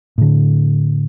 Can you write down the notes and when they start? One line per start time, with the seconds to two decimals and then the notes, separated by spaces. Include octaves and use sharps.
0.18 A2 D3